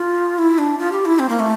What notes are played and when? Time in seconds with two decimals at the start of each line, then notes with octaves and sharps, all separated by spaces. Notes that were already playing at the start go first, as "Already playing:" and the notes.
Already playing: F4
0.38 E4
0.58 D4
0.78 F4
0.92 G4
1.05 E4
1.19 C4
1.29 A#3
1.39 A3